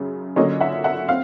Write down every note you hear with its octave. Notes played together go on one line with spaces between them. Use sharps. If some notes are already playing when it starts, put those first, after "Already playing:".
Already playing: F#2 C#3 F#3
D3 F#3 A#3 C#4 C#5 D#5
E5 F#5
E5 F#5
C4 F5